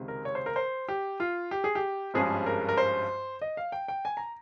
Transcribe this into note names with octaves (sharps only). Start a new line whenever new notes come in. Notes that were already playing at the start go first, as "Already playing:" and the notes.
Already playing: C#2 C3 D#3 G#3 C4
A#4
C#5
C5
A#4
C5
G4
F4
G4
G#4
G4
G#1 G2 F3 G#3 C#4 G#4
A#4
A#4
C5
D#5
F5
G5
G5
G#5
A#5